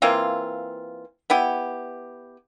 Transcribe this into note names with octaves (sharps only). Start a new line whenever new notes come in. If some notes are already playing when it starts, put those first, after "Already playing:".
E3 A#3 C4 F4
B3 E4 G4